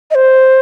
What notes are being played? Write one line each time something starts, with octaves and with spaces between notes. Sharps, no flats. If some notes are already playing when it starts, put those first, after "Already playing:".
D#5
C5